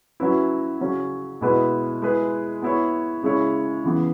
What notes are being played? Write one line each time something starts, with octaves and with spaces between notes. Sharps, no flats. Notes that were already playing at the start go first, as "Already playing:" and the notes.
F#3 C#4 E4 B4
C#3 F#3 C#4
B2 G#3 B3 E4 B4
G#3 E4 G#4 B4
B3 E4 C#5
C#3 G#3 E4 C#5
C#3 E3 B3